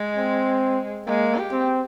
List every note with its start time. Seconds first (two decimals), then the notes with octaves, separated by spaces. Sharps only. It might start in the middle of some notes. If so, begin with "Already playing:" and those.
Already playing: G#3
0.17 C4
1.07 G#3 A#3
1.37 G4
1.52 C4